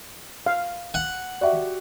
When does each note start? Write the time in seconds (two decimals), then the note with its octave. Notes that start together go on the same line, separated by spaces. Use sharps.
0.46 F5
0.94 F#5
1.41 F#4 G4 D5 E5